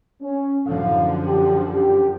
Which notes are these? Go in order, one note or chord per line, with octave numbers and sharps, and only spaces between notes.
C#4
F#2 A2 D3 F3 F5
G4
G4